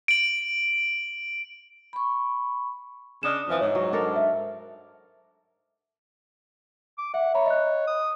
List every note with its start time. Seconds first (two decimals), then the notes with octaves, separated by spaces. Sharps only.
0.08 D7 F#7
1.93 B5 C#6
3.23 C#3 D4 D#5 F6 E7
3.48 F2 E3 F3
3.60 G#2 C#5
3.75 F#3
3.93 D4 A4 A#4
4.16 E5
6.98 D6
7.14 E5 F#5
7.35 C#5 E5 A#5 B5
7.46 D#5 F#6
7.87 D#6